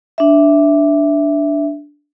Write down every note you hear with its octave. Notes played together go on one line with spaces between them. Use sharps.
D4 E5